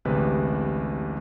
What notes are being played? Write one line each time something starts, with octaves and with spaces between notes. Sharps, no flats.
A1 D2 C3 G#3 B4